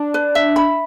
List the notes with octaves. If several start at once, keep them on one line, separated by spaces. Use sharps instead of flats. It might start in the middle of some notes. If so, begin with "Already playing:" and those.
Already playing: D4
B4
E5
B5